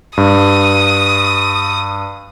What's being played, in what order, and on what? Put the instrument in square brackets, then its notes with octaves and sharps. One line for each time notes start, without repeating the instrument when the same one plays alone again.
[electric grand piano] G2 [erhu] D#6